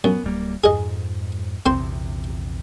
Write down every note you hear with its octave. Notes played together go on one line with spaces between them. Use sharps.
F#2 B3
D1 G3 A#3
F2 G#2 G#4 D#5
A#1 E2 C3 C4 C5 C6